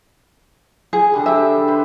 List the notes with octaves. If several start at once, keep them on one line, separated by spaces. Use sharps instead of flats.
G#4
D3 G3
G4 E5 A5
B4 C5